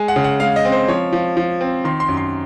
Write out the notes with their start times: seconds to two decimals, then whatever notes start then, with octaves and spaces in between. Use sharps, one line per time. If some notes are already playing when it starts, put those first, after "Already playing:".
Already playing: G#3 G#5
0.08 F#5
0.16 C#3
0.24 F#5
0.40 G#3 F5
0.56 D#5
0.65 C4
0.72 C5
0.88 F3 C#5
1.13 F3
1.37 F3
1.61 C4
1.84 D#3 C6
2.00 C6
2.08 F#2
2.17 C6